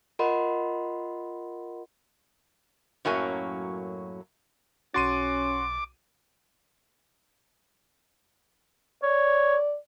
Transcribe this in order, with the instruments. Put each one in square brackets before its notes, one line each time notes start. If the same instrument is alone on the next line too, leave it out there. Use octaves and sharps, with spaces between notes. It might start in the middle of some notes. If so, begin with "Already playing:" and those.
[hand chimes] F4 A#4 D#5 F#5 B5 C6
[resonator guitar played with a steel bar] F#2 A2 F#3 A#3 C#4 G#5
[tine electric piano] B1 A6 [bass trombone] C#4 [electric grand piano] F#4 C6 D#7 [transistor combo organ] D6
[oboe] C#5 [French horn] D5